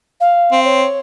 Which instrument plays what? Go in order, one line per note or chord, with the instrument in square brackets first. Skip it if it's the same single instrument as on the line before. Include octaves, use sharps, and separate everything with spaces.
[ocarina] F5
[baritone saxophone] C4
[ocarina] C#5